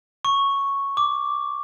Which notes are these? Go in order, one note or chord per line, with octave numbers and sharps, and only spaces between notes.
C#6
D6